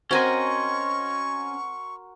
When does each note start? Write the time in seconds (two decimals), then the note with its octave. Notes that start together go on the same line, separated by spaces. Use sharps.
0.11 C4 C#4 F#4 A#4 D#5 G#5 C6 C#6